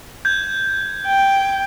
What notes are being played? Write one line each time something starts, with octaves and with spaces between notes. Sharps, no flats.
G6 G#6
G5